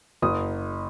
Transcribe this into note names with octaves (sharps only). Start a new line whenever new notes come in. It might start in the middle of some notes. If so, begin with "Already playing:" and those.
F#1 D#6